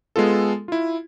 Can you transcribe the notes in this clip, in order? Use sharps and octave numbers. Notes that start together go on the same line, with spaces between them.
G#3 B3 F4 A4
E4 F4